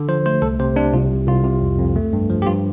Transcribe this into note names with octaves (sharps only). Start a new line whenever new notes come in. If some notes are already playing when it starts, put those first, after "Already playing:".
Already playing: D3
F3 C5
A3 C5
C2 A4
C3 C5
C3 D4
C2 F4
C2
C2 F4
C3
F2
F2
A3
G2
F3
G4
G2 F4